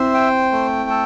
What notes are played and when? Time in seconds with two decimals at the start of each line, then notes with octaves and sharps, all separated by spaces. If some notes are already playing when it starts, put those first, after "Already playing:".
Already playing: C4 E4 C5 E5
0.14 G5
0.52 A3
0.90 A4